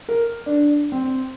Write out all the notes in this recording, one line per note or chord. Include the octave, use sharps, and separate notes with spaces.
A#4
D4
C4